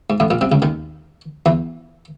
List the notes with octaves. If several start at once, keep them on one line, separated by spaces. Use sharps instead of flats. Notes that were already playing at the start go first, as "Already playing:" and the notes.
G#2
A1 A2
A#1 A#2
C2 C3
C#2 C#3
D#2 D#3
E2 E3